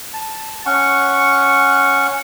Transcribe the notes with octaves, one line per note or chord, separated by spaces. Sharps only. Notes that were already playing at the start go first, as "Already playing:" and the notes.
A5
C#4 F#5 C#6